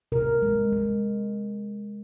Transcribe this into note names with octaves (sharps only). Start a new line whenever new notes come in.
C3 A#4
G#3
G#3